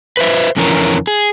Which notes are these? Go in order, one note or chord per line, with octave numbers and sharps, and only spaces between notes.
B4 C5 E5
F2 D3 E3 C#4 A#4
G#4